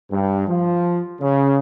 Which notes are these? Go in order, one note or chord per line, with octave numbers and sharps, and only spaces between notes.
G2
F3
C#3